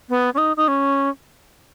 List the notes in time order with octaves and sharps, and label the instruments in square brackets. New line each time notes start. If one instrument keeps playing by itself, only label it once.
[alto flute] B3
C#4
D#4
D#4
C#4